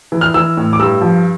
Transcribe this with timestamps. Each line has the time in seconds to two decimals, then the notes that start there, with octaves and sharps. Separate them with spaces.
0.12 E3
0.21 F6
0.34 E3 E6
0.57 A2
0.73 D6
0.79 G2 E6
1.01 F3